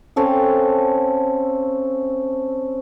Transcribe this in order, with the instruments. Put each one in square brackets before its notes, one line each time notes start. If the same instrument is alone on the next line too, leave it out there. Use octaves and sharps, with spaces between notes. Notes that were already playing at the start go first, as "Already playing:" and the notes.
[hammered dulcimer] C4 C#4 A4 F5